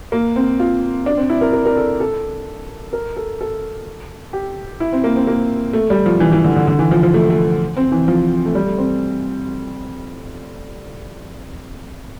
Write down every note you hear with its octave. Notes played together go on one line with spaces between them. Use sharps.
A#3
C4
F4
D4
C4
E4
A#4
A#4
A#4
A4
A4
A#4
A4
A4
G4
E4
C4
A#3
C4
A#3
A3
G3
F3
E3
E3
D3
D3
D3
E3
F3
F3
A3
A3
C4
E3
F3
A3
G3
A3
C4